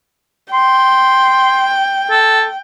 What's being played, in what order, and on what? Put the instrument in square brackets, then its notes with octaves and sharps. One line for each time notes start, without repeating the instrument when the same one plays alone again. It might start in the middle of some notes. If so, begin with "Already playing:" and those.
[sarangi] G5 [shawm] C6
[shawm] A4